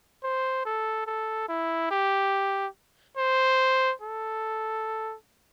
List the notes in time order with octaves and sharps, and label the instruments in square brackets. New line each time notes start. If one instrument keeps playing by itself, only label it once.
[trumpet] C5
A4
A4
E4
G4
C5
A4